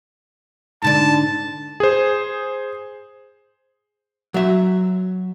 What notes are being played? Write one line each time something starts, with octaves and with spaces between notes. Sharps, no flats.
G#2 D3 D5 A5
G#4 C5
F#3 E5